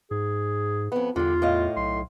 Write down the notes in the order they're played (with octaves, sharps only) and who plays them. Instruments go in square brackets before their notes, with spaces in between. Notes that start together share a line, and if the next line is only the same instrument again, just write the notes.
[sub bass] G#2 [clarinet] G#4
[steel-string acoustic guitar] F2 B3
[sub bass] E2 [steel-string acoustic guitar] G2 D3 [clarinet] F4
[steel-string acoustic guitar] A2 D#5 F5
[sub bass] B1 [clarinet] C6